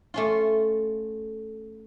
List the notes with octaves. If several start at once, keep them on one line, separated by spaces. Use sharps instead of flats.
A3 C#4 F4